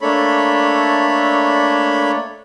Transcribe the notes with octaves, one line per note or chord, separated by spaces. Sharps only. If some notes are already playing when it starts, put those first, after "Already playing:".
A3 A#3 D4 A4 C#5 B5